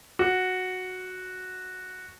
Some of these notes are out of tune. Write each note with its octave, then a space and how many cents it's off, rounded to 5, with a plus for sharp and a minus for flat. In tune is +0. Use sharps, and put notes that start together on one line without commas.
F#4 -5